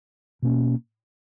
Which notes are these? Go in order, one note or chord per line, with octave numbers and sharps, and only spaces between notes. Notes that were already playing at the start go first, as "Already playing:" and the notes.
B2 A#3 C#4